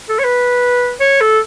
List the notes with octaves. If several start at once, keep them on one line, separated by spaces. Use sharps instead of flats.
A4
C#5
B4
C#5
A4